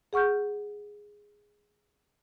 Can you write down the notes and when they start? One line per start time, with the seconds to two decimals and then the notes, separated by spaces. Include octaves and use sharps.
0.13 G#4 F#5 C#6 F6 G6